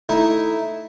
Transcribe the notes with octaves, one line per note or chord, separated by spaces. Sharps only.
A3 D#4 E4